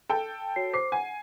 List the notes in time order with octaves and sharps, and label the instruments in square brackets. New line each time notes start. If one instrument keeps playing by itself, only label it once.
[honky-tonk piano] A4 G5
[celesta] F#4 C#5 C7
[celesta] C5 D6 [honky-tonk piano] C7
[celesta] F#5 [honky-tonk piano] G#5